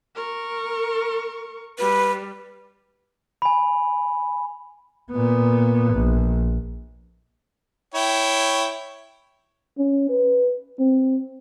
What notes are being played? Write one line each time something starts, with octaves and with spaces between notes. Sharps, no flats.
A#4 C#6
G3 B4
G#5 B5
A#2 B3
A#1
E4 C#5 G5
C#4
B4
C4